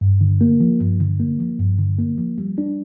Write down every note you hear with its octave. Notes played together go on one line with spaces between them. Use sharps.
G2
D3
A#3
F3
G2
D3
A#3
F3
G2
D3
A#3
F3
G3
D4